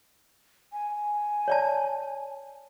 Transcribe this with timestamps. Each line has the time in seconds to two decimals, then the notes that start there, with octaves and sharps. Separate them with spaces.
0.73 G#5
1.48 C#5 D5 A5